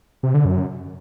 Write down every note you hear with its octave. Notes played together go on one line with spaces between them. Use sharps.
C3
D3
F#2